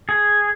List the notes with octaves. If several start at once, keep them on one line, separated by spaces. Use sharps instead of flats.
G#4